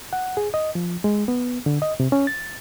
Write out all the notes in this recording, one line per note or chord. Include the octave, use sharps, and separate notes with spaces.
F#5
G#4
D#5
F3
G#3
B3
D3
D#5
C3
C#4
A6